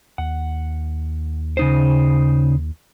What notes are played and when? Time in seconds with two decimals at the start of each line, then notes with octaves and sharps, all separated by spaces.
0.18 D#2 F#5
1.57 C#3 D#4 C5